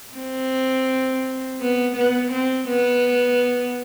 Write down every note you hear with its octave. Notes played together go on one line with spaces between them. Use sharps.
C4
B3
B3
C4
B3